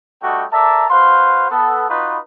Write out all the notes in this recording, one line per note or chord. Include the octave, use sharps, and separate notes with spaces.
G3 A3 D4 F#4 D#5 G5
A4 A#4 D5 E5 A5 A#5
F#4 B4 C5 F5 C6
B3 A4
D#4 F4 F#4 B4